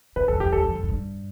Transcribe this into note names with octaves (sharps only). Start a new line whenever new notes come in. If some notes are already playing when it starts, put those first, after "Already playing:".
C3 B4
E2 A4
F2 G4
E2 A4
F2
F2
A2
G2